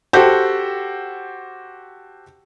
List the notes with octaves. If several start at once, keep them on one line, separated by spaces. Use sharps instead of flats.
F#4 G4 A4 C5